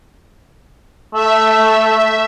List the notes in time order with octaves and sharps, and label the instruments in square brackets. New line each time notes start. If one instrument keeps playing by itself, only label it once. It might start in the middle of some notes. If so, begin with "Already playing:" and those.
[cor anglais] A3 [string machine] E5